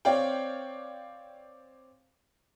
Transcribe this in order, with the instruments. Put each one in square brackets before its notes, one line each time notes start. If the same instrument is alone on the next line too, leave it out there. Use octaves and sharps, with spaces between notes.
[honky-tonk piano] C4 C#5 D5 F5 G5